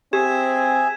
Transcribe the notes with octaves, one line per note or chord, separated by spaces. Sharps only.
C4 G4 G#4 E5 G#5 G#6 E7